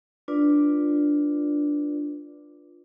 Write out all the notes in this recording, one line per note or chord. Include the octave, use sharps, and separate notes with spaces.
D4 F4 B4 D5